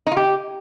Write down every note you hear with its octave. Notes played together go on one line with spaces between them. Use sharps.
D#4
F4
G4